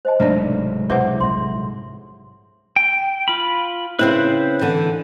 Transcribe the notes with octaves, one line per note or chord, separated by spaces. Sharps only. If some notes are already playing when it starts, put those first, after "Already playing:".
C5 D#5 A5
E1 G#2 C3 F#3 A3 D4 D5
B2 E4 G#4 B4 C5 E5 F#5
A#1 G3 E5 C6
G5
F4 B5
C#3 C4 E4 B4 C5
D3 E3